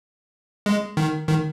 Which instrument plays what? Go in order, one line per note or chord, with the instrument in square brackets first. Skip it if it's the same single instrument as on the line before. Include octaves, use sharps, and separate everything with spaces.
[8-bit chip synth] G#3
D#3
D#3